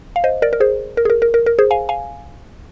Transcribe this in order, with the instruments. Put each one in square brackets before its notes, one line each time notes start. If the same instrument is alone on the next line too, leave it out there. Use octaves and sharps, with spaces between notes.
[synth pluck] F5
C5 D#5
A#4 D5
A#4
G#4 C5
A#4
G#4
A#4
A#4
A#4
A#4
G#4 C5
F5 G#5
F5 G#5